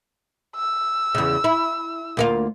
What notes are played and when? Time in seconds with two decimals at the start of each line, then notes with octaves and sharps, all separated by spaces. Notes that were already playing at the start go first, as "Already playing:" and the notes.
0.56 E6
1.15 E2 C#3
1.44 E4
2.17 D2 A#3 F4